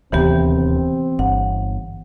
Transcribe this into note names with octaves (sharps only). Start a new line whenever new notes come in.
D1 D#2 C3 E3 B3 C4 G4
G1 F#5